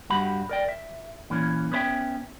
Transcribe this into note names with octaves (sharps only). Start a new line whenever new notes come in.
G2 F#4 G4 F#5 B5
A#4 D5 G5
E5
A#2 E3 A#3 C#4
B3 C#4 C5 E5 G5